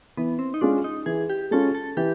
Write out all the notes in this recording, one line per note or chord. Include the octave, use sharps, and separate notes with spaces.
E3 B3
C4
D#4
G#3 C#4 D4 F4
D#4
E3 G#4
G4
G#3 C#4 F4 A4
A4
E3 G4